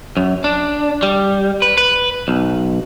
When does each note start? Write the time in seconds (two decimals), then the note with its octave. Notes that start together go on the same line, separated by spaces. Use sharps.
0.17 F#2
0.44 D4
1.03 G3
1.62 B4
1.78 B4
2.28 B1